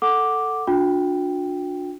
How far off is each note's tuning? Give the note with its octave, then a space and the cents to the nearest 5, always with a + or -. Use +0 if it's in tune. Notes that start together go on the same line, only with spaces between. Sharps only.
A4 +5 F#5 +0 D6 +0
D4 +0 F#4 -45 G5 +0